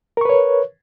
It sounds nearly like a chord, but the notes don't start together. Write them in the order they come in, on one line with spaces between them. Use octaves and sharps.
A#4 C#6 B4 C#5